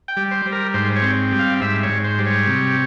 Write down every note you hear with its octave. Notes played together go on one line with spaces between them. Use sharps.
G5
G3
C5
G3
A#4
G#2 C5
C#5
C4
G3
F5
G#2 E5
C#5
G#2
C5
G3
C#5
C3